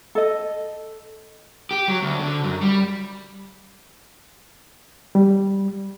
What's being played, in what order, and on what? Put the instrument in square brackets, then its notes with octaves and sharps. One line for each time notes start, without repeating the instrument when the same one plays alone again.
[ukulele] A4 D#5
[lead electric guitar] G4
F#3
D2
D3
F#2
G3
[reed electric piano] G3